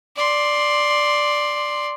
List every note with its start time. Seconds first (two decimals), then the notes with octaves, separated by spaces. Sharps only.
0.16 D5 C6